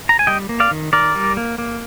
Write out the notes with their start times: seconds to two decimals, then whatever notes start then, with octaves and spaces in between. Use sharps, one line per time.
0.09 A#5
0.19 G#5
0.27 G3 D#5 G5
0.49 A#3
0.60 D5 F5
0.71 D#3
0.93 D#3 A#4 D5
1.15 G3
1.37 A#3
1.58 A#3